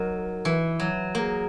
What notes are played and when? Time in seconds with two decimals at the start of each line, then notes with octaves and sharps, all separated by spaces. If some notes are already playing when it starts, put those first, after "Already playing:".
Already playing: F#3 D#4 A#4
0.45 E3
0.80 F#3
1.14 A#3 G#4 A#4